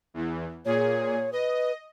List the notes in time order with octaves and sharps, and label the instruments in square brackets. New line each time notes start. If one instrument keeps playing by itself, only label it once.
[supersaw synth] E2 E3
[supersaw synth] A#2 G#4 [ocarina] C#5
[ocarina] B4 [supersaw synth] D#5